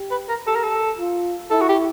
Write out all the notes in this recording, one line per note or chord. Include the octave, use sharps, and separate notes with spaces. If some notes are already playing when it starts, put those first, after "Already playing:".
Already playing: G4
B4
A#4
G4 A4
A#4
A4
F4
E4 A4
F#4
G4